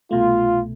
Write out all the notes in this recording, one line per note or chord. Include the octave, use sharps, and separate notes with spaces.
C2 B2 A3 F4